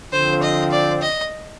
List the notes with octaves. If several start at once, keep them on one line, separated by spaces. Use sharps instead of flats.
D3 F3 C4 C5
D#5
D5
D#5